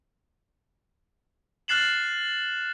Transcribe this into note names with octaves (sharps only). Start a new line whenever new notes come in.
F6 F#6 A6 C7 E7 F#7